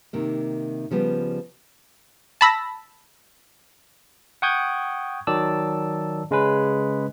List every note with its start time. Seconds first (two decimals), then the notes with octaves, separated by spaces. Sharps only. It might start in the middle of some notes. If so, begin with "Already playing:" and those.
0.13 C3 D#3 A#3
0.91 C#3 F3 G3 B3
2.41 A5 B5 E6 A#6
4.42 F#5 G5 C#6 D#6 G6 G#6
5.27 D#3 F#3 D5 A5 E6
6.31 C#3 G#3 C#4 B4